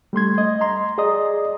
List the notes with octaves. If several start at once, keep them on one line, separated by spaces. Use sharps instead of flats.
G3 A3 C6 G#6
D#5
A#5 C6
G#4 D5 D#5 A#5 D#6